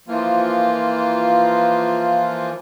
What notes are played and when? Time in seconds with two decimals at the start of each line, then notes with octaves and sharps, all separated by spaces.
0.08 E3 F3 A#3 F4